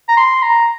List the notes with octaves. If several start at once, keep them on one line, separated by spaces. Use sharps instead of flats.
A#5
C6
A#5